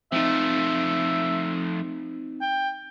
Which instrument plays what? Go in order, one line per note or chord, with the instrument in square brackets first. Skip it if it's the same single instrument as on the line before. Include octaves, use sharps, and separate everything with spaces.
[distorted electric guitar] F3 A3 [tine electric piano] C4 D#4 [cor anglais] E5
[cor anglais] G5